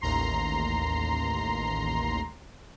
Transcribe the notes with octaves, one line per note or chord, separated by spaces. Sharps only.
A1 D#2 A#5 C6 C7